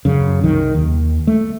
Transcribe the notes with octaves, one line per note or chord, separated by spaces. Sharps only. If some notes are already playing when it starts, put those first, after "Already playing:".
F#2 C#3
C2 D#3
D#2
A3